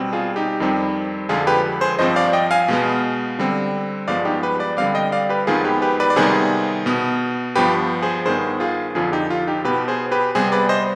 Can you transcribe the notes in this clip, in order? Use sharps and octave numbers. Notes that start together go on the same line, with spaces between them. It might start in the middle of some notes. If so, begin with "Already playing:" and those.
Already playing: B2 G3 C4
F4 G#4
D#4 G4
F2 D#3 G3 C4
F2 D3 F3 G#3 F4 G#4
G4 B4
G#4 C5
G2 F3 C4 C5 D#5
D5 F5
D#5 G5
F5 G#5
B2 G#3 B3
D3 G3 C4
G2 F3 G#3 B3 D5 F5
D#4 G4
G4 B4
B4 D5
D3 G3 C4 D5 F5
D#5 G5
D5 F5
G4 B4
F2 D#3 G#3 B3 F4 G#4
G4 B4
G4 B4
B4 D5
D5
C3 D#3 G3 B3 G#4 C5
B2 B3
G2 F3 B3 G4 B4
G#4 C5
G2 D#3 B3 G#4 C5
F4 G#4
F2 D3 F3 F4 G#4
D#4 G4
F4
D#4 G4
B2 B3 G4 B4
G#4 C5
G4 B4
C3 G3 B3 G#4 C5
B4 D5
C5 D#5